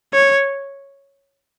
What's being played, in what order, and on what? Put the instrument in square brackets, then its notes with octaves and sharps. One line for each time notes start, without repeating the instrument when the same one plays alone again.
[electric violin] C#5